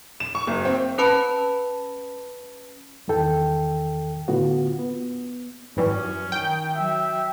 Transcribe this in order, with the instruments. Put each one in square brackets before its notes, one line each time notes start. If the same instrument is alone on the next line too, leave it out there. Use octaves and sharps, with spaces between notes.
[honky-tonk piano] E7
C#6
F#1
C4
[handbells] C#4 B4 A5 B5
[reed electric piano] E2 G2 D#3 A4 G5
A2 D3 B3 F4 F#4
B3
[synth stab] G#1 E3 G3 [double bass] F#2 [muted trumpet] C#4
[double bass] D#3 [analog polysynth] G5
[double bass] F#3 [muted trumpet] E5